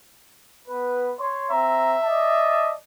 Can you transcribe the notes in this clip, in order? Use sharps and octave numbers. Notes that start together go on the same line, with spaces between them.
B3 B4
C#5 C6
C4 E5 A#5
D5 D#5 A5